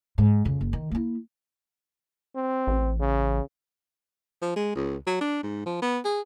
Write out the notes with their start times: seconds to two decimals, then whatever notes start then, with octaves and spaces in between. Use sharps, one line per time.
0.18 G#2
0.45 F2 C#3
0.61 F#1
0.73 D#3
0.91 A#3 E4
2.36 C4
2.67 A1
3.00 C#3
4.42 F3
4.56 G#3
4.75 C#2
5.07 F#3
5.21 D4
5.43 G#2
5.66 F3
5.82 B3
6.05 G#4